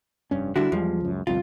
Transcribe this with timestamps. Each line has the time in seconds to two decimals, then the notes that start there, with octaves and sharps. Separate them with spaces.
0.31 F1 G2 C#4
0.56 D3 G3 D4 E4 F#4
0.72 E2 F3 G3 G#3
1.01 C#2 F#2
1.27 G1 C2 F2 F4